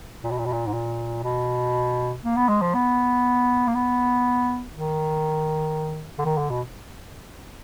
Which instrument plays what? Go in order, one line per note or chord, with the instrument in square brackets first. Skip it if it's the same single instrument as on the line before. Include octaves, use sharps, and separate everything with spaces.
[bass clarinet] A#2
B2
A#2
B2
A#2
G#2
A#2
B2
A#3
B3
G#3
F3
B3
A#3
B3
D#3
D3
D#3
D3
B2